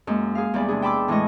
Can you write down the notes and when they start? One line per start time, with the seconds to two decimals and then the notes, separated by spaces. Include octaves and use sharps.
0.07 F#2 G#3 A#3
0.35 G#4 F5
0.54 E2 G3 D5
0.68 C3 D4 G#4
0.82 G5 A5 B5 C6 D6 E6
1.08 A2 E3 G#3 A3 D#5 C#6